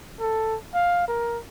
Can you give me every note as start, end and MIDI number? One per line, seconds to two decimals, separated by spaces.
0.20 0.57 69
0.75 1.05 77
1.08 1.39 70